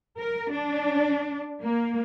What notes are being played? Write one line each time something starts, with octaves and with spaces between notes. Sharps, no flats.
A#4
D4
A#3